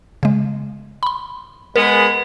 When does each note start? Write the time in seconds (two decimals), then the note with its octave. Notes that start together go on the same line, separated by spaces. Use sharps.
0.23 C#3 G#3
1.03 B5 C6
1.76 G#3 B3 A#4